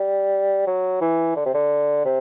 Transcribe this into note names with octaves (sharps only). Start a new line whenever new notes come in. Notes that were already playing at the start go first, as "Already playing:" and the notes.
Already playing: G3
F#3
E3
D3
C3
D3
C3